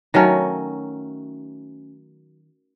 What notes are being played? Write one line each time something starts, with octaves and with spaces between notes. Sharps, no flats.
D#3 F#3 A3 C#4